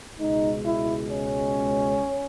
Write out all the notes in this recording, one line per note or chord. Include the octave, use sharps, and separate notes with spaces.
C#2 B2 G#3 D#4
E4
C#4